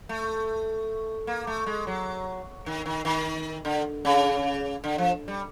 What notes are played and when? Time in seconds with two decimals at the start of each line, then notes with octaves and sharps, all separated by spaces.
0.09 A3
1.27 A#3
1.47 A3
1.66 G#3
1.87 F#3
2.66 D#3
2.86 D#3
3.05 D#3
3.65 D3
4.05 C#3
4.84 D3
4.98 F3
5.28 G3